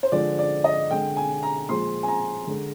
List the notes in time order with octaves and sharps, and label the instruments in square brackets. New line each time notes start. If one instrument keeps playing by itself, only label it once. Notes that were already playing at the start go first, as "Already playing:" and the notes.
[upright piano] C5
D3 F3 G#3 D5
D5
D#5
D3 G#3 G5
G#5
A#5
A#2 F3 G#3 C6
G#5
A#5
D3 G#3